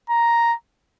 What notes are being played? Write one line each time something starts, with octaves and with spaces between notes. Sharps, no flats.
A#5